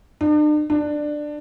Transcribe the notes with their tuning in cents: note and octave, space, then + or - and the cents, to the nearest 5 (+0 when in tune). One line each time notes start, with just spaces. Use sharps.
D4 +45
D4 +15